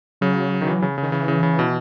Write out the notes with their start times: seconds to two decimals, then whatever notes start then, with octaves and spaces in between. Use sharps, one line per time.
0.21 C#3 F#3
0.61 D#3
0.67 E3
0.82 C#3
0.98 C#3
1.03 D#3
1.12 C#3 E3
1.28 C#3
1.43 C#3
1.59 B2